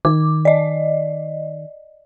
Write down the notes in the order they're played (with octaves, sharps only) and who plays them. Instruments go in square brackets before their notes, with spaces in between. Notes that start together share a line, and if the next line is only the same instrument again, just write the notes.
[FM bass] D#3 [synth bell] D6
[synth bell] D5 D#5